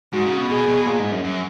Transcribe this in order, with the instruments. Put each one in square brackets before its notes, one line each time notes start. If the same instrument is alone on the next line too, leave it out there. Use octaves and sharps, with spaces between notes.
[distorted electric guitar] G#2 [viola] F#4
[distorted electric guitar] C#3
B2
[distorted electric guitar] B2 [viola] G#4
[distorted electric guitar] B2
A#2
G#2
F#2
F#2